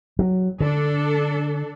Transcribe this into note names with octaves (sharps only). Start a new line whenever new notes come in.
F#3
D3 D4 A4